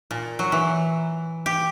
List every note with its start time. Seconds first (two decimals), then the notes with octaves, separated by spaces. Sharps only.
0.11 A#2
0.39 F#3
0.52 E3
1.46 G4